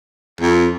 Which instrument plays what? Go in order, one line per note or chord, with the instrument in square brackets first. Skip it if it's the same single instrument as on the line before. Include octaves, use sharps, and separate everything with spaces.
[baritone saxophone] F2